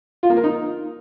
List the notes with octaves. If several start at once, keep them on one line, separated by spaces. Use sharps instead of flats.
F4
A#3
A#4
D#4